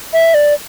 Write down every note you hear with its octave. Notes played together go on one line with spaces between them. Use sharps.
E5
D5